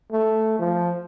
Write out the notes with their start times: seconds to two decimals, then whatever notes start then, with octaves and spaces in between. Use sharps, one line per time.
0.12 A3
0.59 F3